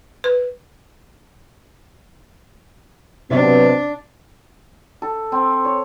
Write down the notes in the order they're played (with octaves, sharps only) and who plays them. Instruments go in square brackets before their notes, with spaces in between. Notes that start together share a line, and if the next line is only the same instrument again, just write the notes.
[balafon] B4
[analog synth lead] C3 [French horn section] F#3 B3 [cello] D4
[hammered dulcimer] A4
C4
C#5